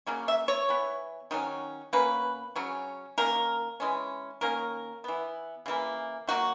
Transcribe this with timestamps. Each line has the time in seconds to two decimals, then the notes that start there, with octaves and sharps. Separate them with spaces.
0.07 C#3 F#3 A#3 C#4
0.28 E5
0.48 C#5
0.69 E3 B3
1.31 D#3 F#3 C#4
1.93 B2 A#3 C#4 B4
2.56 C#3 F#3 C#4
3.18 D#3 A#3 C#4 A#4
3.80 E3 G#3 C#4
4.41 D#3 A#3 C#4 A#4
5.04 E3 B3
5.66 C#3 E3 A#3
6.27 D#3 F#3 A#3 F#4